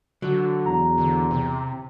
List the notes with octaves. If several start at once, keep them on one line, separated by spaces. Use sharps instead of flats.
D3 F#3
E2 A#5
D3
C3